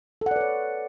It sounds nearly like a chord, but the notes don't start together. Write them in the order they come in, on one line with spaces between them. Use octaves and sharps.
A4 F#5 D5 B4 C#5